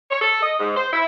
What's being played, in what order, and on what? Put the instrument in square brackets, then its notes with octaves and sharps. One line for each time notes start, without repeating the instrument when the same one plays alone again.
[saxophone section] C#5
A4
D#5
G#2
C5
E4